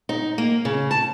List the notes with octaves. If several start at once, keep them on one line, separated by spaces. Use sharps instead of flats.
D#4
A#3
C#3
A5